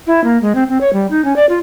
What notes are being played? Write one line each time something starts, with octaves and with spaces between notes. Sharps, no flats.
E4
A#3
G#3
C4
C4
C#5
G3
D#4
C#4
D5
F4